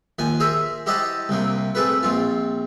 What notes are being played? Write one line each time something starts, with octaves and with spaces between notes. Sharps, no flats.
D#2 F3 G#5
G#4 A#4 C5 E5
E4 G4 C5 D#5 F#5 A5
C2 C3 A#3 C4
A3 C4 G#4 A4 B4
A#1 C4 F4